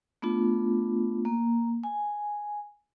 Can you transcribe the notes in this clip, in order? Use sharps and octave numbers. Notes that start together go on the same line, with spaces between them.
A3 B3 D4 F4
A#3
G#5